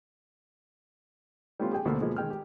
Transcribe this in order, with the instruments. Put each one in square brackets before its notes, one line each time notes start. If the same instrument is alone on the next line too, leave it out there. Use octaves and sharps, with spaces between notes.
[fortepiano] G3 A3 B3 C#4 F4
G4 G#4 G5 G#5
D2 B2 A3 A#3 C5 E6
B2 F3 G#3 A#3
D#3 G#3 G5 F6
G4